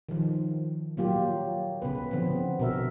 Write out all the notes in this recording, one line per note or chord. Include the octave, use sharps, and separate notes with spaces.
D#3 F3
F#3 A#3 F4 G4
C#3 B3 B4
D3 F3 B3 C4
B2 A#4 E5